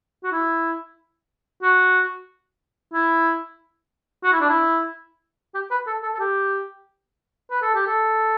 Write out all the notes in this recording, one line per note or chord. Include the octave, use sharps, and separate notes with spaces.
F#4
E4
F#4
E4
F#4
E4
D4
E4
G4
B4
A4
A4
A4
G4
B4
A4
G4
A4